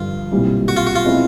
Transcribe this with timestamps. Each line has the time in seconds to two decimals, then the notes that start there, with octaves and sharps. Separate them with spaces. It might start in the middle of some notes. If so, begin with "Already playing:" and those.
Already playing: G2 D3 F3 F4
0.32 B1 A#2 G3 C4 E4
0.68 F#4
0.77 F4
0.87 F#4
0.96 F4
1.04 B2 G#3 C4 E4